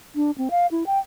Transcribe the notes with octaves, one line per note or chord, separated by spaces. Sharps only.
D4
C4
F5
E4
G5